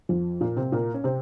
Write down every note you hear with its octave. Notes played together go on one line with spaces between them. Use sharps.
F2 F3
A#2 A#3
C3 C4
A#2 A#3
C#4
C3 C4